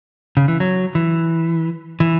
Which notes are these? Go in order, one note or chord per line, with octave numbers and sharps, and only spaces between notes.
C#3
E3
F#3
E3
E3